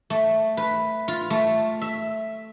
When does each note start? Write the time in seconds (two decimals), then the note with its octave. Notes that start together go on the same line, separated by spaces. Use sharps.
0.10 A3
0.57 B4
1.08 F4
1.30 A3
1.82 E5